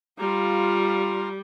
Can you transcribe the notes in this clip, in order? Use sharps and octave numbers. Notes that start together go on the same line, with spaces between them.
G3 F4 F5 A#5